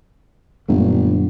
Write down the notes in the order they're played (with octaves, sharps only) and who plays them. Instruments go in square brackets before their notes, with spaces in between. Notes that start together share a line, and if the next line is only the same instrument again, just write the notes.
[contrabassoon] G1 [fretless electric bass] F#2 A#2 A3